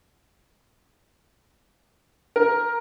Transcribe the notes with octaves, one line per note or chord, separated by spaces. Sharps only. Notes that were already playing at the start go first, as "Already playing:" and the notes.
A#4